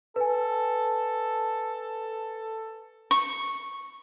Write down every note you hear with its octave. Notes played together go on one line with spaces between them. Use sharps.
A4 B4 G#5
C#6